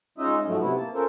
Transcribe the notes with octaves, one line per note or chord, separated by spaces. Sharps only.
G#3 C#4 D#4 F4 D#5 E5
G#2 F3 F#3 A3
C3 B3 E4
A#3 A5
C#4 F4 A4 A#4 C5